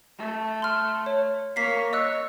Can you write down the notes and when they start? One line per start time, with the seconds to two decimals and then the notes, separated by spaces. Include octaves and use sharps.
0.18 A3
0.62 C6 F6
1.06 C#5
1.56 A#3 C#5 B6 C7
1.93 C#5 D#5 E6 F#6